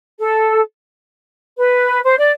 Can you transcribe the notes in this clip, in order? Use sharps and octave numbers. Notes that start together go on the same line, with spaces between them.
A4
B4
C5
D5